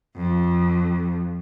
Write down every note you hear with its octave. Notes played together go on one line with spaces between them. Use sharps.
F2